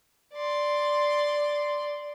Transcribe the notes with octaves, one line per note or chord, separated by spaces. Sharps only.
D5 C6